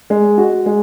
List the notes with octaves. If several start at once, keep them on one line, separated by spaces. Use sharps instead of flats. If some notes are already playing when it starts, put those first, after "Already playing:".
G#3
F#4
G#3